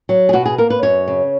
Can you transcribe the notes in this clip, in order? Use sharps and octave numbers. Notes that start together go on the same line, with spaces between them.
F#3
G#4
B2 F#4
G#4
A#3 A#4
B4
F#2 C#5
C#3